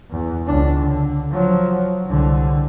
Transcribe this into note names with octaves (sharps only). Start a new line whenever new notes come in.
E2
C#2 D4
D3
F3 F#3
C2 D3